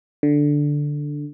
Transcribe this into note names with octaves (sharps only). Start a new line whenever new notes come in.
D3